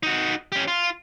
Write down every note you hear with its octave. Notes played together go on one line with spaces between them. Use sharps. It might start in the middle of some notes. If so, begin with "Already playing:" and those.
D#4 F#4
C#4 G4
F4